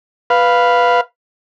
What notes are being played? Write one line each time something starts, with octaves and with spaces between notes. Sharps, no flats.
B4 F5